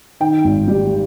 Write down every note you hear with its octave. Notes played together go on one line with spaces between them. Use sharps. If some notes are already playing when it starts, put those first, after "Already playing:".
D#3 G5
G#1
G3